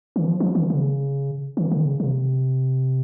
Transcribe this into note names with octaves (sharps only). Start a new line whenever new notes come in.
D#3
F3
F3
D#3
C#3
D#3
C#3
D#3
C#3
C3